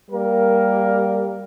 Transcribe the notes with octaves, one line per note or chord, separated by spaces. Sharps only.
G3 A#3 A#4